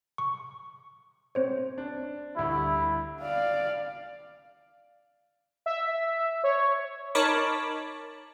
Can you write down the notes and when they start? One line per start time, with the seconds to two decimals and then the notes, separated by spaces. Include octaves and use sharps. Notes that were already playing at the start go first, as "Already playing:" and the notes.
0.18 C#6
1.35 C4 C5 C#5
1.78 D4
2.36 D2 G3 E4
3.21 D5 F5
5.66 E5
6.44 C#5
7.15 D#4 A#4 C#5 A5 B5 D6